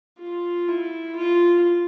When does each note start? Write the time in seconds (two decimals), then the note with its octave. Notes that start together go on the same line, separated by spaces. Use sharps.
0.19 F4
0.68 E4
1.16 F4